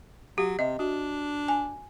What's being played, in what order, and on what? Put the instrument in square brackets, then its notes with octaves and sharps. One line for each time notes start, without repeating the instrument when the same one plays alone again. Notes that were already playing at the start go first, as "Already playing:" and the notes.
[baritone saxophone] F#3 [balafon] G4
[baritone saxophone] C3 [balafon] D#5 E5
[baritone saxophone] D4 [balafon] F#4
[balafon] G#5